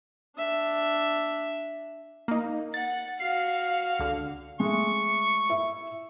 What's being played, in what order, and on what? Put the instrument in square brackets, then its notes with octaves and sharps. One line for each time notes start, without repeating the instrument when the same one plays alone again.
[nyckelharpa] D4 E5
[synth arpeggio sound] A#3 D#4
[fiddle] F#5 [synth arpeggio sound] A6
[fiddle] F#4 F5 [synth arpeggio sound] C7
[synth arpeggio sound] C#2 D3
[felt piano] G#3 A3 [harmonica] C#6
[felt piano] E4 E5